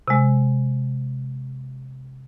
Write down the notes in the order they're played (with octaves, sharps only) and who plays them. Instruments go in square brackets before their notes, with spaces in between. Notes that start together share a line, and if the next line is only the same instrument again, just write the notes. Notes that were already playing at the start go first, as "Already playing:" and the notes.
[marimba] C3 G#3